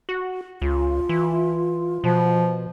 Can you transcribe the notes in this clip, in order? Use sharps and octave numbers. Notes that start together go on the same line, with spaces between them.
F#4
C#2 F4
E3
B2 F3